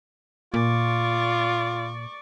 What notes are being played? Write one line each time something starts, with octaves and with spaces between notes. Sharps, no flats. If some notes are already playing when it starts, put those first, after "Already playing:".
A#2 F4 D5 C#6